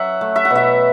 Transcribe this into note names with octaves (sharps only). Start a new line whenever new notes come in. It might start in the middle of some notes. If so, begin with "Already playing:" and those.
Already playing: F#3 E5 F#5
A3
E5
F#5
B2 E5